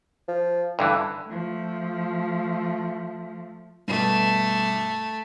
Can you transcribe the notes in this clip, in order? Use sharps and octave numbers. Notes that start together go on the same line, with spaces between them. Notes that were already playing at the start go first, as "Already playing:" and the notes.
F3
G2 D3 E3 A3
F3 A3
G2 B2 A3